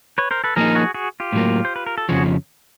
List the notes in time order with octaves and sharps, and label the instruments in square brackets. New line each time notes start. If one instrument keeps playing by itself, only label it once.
[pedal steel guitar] B4 C#5
A#4 C5
A4 B4
[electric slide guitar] F3 A#3 D#4 [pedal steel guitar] G#4 A#4
[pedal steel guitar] F#4 G#4
F#4 G#4
F4 G4
[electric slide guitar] A2 F#3 A#3
[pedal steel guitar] C5
B4
A#4
A4
[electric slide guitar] F2 C#3 F3 [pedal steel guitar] F#4 G#4